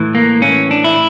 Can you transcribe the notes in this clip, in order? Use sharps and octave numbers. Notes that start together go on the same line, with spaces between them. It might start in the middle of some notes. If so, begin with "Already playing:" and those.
Already playing: A2 E3
A#3
A2 E3 C#4
D4
E4